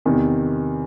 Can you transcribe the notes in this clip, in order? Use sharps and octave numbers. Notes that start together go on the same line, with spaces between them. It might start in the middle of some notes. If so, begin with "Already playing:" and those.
E2 C3 D#3